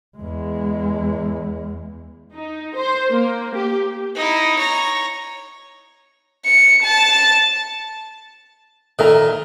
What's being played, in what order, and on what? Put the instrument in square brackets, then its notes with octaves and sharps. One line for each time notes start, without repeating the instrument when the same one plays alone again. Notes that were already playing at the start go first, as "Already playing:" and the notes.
[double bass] E2 G#3
[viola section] D#4
C5
A#3
G4
[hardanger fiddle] D#4 E4
C#5 A#5
[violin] C#7
A5
[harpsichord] A#2 D#3 [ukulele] A4 E5 A#5